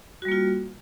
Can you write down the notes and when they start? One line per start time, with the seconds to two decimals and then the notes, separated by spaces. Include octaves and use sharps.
0.22 F#4
0.25 G3
0.28 A#3
0.32 F4